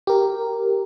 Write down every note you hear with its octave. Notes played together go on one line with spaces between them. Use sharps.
G4 A#4